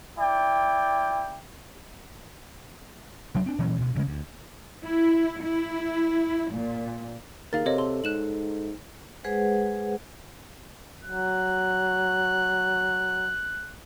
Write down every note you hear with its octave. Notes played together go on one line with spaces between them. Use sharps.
E4 D5 G5
F1 F#3 D4
C4 D4
A#2 E3 F#3 C#4
D2 B2
D2 C#3 G#3
D2
E4
E4
A#2
D#2 G#4 A#4 F5 A6
C3 A4 C#5 D#5
A4 C6
G#2 F#6 E7 F#7
G#3 G#4 B4 C5 F#5
F#3 F#6